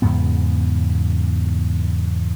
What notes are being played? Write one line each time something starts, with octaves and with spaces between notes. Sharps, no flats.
E2 G#2 C#3 B3